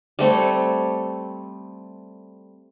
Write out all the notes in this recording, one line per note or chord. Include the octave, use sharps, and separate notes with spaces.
G3 A3 C4 C#5